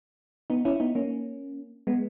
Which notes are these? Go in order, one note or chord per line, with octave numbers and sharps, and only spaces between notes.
B3 D#4
C#4 E4
B3 D#4
A#3 C#4
G#3 B3